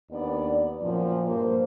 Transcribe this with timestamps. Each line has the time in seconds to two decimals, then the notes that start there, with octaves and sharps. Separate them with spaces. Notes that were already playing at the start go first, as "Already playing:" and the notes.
0.11 D#2 B3 D4 D5
0.82 F#2 A#2 F3
1.26 G2 A#3 C5